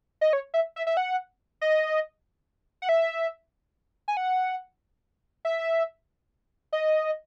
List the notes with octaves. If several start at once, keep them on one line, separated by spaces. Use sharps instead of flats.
D#5
C#5
E5
E5
E5
F#5
D#5
F#5
E5
G#5
F#5
E5
D#5